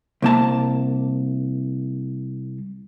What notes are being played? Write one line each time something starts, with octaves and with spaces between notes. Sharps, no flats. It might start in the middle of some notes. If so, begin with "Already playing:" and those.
C2 A#3 A5